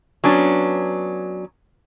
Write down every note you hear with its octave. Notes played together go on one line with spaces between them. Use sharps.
F#3 B3 C#4 D4